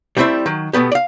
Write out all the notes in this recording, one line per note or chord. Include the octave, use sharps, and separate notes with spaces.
G3 A3 C4 E4 C5 E5
D#3 F#3
B2 A3 B3 G4
D5 F5